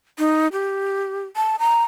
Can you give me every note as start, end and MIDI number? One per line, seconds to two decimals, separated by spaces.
0.19 0.48 63
0.52 1.24 67
1.36 1.56 81
1.59 1.84 82